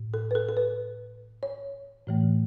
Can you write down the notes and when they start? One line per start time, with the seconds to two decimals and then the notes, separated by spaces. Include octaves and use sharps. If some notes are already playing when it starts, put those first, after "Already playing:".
Already playing: A2
0.14 A4
0.31 B4
0.35 A4
0.49 A4
0.57 B4
1.43 C#5
2.07 A2 E3 A3